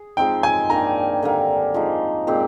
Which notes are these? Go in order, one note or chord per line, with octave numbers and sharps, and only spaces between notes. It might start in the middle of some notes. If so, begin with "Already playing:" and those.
Already playing: G#4
F3 G#3 C4 D#4 G5
G#5
D#3 A#3 D4 A#5
D3 G3 A#3
F3 G#3 D#4
A#2 G#3 C4 G4